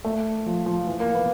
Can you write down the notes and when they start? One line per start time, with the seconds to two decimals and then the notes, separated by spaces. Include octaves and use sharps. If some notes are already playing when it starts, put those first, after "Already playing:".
0.05 A3
0.46 F3
0.66 F3
0.87 E3
1.00 A#3
1.15 B3